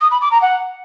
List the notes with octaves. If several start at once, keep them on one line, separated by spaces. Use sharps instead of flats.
D#6
B5
D6
A#5
F#5